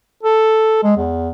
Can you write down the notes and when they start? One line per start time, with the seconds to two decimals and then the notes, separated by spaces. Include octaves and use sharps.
0.23 A4
0.84 G#3
0.97 E2